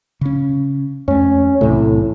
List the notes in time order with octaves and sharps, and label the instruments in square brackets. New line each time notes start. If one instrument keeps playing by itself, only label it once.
[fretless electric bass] C#3 C#4
[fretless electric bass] F2 A3 [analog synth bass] C#4
[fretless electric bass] B1 E2 C3 [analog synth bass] A2